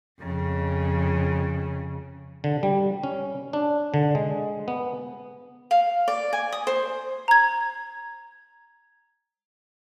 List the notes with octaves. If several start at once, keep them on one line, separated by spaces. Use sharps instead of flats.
F2 C#3
D3
G3
C#4
D4
D3
G#3
B3
F5
D5
G#5
D#6
C5
A#5 G#6